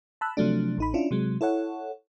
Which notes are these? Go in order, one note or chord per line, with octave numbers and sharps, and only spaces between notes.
A5 B5 E6 F#6
C3 F3 F#3 A3 D4
A1 D#4 B5
C#4 D4 E4 F4
C3 F#3 G#3
E4 A4 C#5 F#5